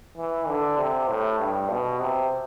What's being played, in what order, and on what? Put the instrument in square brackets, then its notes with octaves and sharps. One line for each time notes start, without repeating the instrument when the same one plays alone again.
[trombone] E3
D3
C3
A2
G2
B2
C3